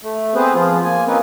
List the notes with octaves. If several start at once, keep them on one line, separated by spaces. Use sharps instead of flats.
A3
B3 C4 G#4 B4 C5
F3 F4 G#4
A#3 G#5
A#3 C4 C#4 D#4 A#4 B4